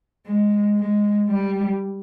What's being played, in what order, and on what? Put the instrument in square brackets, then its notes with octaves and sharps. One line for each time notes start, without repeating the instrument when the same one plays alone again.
[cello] G#3
G#3
G3